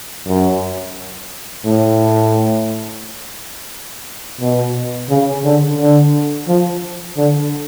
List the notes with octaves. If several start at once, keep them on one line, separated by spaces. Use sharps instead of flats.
F#2
A2
B2
C#3
D3
D3
F3
D3